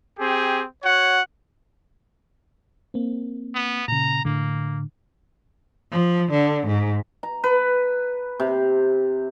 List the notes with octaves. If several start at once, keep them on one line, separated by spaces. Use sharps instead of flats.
C4 G4 G#4
F#4 C#5 F#5
A#3 C4
B3
A#2 C#3 A#5
A2 D3 A#3
F3
D3
G#2
A#5
B4
C3